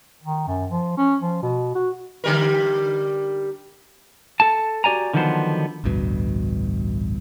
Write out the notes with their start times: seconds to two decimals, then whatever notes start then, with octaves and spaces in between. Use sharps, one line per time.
0.23 D#3
0.48 F#2
0.70 F3
0.98 C#4
1.21 F3
1.43 B2
1.75 F#4
2.24 D3 G3 A#4
4.40 A4 A5
4.84 F#4 G4 D5 G#5 A#5
5.13 D3 D#3 F3 F#3 B3 C5
5.84 A1 D2 G2 B2